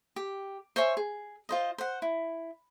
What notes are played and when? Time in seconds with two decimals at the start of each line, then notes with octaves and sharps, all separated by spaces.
0.16 G4
0.76 C5 C#5 E5 G#5
0.97 G#4
1.49 F4 C5 D#5
1.78 C5 F#5
2.02 E4